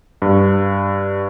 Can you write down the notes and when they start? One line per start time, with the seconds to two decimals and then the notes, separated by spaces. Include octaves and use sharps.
0.22 G2